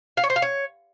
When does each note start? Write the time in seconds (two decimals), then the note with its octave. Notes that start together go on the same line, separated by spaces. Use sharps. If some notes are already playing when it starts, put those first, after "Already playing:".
0.17 F5
0.24 C#5
0.30 C5
0.36 F5
0.42 C#5